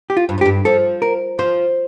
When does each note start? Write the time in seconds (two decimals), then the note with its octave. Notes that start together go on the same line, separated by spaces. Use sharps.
0.10 G4
0.17 F4
0.29 G2
0.38 F2
0.41 G4
0.46 G2
0.65 F3 A4
1.02 A#4
1.39 F3 C5